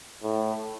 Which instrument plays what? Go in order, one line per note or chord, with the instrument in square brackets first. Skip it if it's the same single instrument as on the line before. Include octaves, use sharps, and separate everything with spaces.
[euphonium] A2